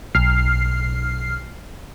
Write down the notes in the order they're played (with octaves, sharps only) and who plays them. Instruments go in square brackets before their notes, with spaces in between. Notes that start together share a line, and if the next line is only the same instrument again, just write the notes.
[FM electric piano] B1 F6 C7